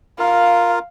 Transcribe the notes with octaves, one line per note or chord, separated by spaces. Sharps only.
F4 A#4 F5